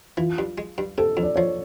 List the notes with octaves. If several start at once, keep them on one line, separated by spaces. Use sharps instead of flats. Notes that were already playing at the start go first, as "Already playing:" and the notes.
E3 F4
G2
G#3
G2
C3 A4
F2
D5
F3 C#5